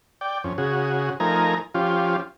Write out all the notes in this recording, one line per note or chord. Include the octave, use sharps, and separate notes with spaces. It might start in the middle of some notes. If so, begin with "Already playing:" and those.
D5 G5
F2 C#4
C#3 F#4 G#4
F3 A3 D#4 A#4 G#5 A#5
F3 C#4 F4 G4